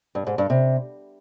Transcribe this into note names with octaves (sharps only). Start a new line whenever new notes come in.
G2
G#2
G2
C3